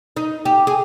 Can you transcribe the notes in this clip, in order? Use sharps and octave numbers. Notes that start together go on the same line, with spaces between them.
D#4
G4
G#4